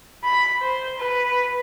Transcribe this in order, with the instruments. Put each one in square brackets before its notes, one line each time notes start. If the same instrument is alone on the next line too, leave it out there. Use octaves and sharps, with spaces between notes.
[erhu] B5
C5
B4